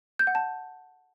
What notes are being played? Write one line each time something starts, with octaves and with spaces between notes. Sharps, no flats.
G6
F#5
A5